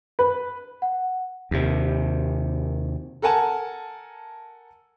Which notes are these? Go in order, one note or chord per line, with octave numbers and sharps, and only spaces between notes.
B4
F#5
D#2 C3
A4 A#4 F#5 G#5 A5